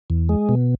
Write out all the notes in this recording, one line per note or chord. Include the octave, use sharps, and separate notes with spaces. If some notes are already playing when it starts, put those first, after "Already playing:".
E2
G#3
B2